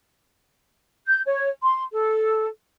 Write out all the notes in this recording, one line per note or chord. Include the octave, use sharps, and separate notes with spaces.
G6
C#5
C6
A4